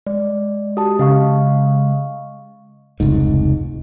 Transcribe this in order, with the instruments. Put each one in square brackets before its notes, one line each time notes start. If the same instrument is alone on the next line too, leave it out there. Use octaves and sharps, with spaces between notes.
[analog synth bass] G#3 [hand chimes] D5
[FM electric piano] F#4 [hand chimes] G4 A5 D#6
[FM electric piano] C#3 [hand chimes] D#5 F5 C#6
[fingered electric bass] F1 C#2 G#2